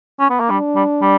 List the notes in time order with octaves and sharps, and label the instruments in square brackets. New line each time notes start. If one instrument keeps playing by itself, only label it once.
[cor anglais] C#4
B3
A#3
[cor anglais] G3 [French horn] D4
[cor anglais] G3
G3